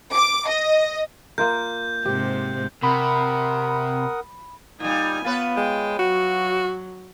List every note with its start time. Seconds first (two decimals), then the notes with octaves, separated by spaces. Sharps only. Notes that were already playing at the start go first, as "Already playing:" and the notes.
0.13 D6
0.48 D#5
1.38 A#3 F4 A#4 G6
2.06 G#2 C3 G4
2.83 C3 A#4 F#5 B5 D#6
4.80 A#2 G3 D#4 G#5
5.25 B3 F4 B4 C#5
5.57 G#3 G5
5.99 F#3 F#4